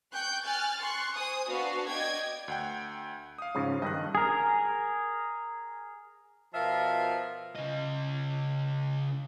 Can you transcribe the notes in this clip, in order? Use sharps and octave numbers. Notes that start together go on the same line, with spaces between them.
G5 C#6 F#6 G6
G#5 F6 F#6 A6
C6 C#6 F#6
C5 G#5 D#6
B3 D4 F#4 B4 F5
D5 D#5 G5 G#6
D2 F#5 G5
F5 D#6
G#2 C#3 F3
G2 D#3 D#5 F#6
G#4 A#4
B2 F3 F4 A#4 E5 F5
C#3 D#5